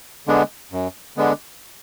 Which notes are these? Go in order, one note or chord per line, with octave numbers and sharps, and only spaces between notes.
D3 G#3 B3 D4
F#2
D3 G#3 B3 D4